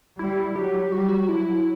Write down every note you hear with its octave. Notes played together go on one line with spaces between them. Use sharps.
G3 E4
F#3 G4
G3 F#4
G4
F#4
F#3 E4